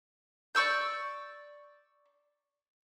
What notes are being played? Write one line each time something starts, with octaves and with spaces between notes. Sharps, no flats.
D5 C#6 E6 G6